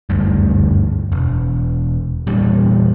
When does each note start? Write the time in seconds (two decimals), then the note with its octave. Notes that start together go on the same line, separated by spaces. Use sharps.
0.10 F#1 D2 G2
1.12 E1
2.27 E2 A#2 G3